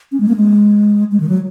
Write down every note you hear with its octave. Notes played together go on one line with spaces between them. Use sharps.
C#4
G#3
A#3
G#3
G#3
D#3
F#3